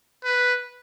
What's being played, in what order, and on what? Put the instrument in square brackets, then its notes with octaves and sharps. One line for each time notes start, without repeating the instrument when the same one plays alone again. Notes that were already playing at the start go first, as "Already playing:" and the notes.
[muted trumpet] B4